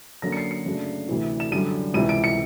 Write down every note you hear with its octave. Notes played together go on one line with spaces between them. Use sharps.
D3 F#3 A#3 C#4 A#6
C#7
C7
C#7
F#2 C#3 F#3 A3 D4
D2 C3 E3 A3
E7
F#2 D3 G3 D#7
C#2 C3 E3 D#7
D7
C#7